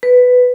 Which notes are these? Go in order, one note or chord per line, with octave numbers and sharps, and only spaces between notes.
B4